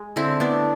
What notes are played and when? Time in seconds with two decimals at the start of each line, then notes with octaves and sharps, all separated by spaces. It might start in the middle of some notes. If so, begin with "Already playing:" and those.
Already playing: G#3
0.16 D3 C4 E4
0.40 A3 B3 D4